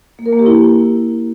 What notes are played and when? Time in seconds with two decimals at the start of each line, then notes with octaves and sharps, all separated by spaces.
0.19 A#3
0.26 A#4
0.32 A#3
0.39 G4
0.46 E4